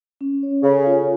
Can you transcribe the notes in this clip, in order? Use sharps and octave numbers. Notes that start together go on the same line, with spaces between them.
C#4
C#5
C#3 A4
F4